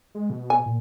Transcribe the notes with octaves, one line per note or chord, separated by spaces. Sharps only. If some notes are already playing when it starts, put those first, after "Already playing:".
G#3
B2
G#5
A#2